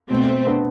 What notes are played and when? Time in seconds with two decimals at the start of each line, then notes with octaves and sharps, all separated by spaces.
0.10 B2 A3 C4
0.47 B3 D4